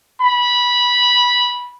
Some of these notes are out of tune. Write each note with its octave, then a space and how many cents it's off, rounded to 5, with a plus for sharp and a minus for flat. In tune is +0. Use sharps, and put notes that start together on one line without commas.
B5 -15